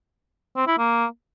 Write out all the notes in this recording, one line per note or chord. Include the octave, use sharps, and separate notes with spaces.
C4
E4
A#3